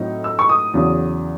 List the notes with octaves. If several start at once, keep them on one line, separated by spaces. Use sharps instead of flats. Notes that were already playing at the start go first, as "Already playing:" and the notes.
Already playing: A2 F#3 C4 D#4
E6
C#6
D#6
E2 C#3 F#3 C#4